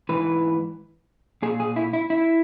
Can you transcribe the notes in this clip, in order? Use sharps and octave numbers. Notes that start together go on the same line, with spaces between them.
G#2 E3 B4
A#2 G#4
G#4
E4
E4
E4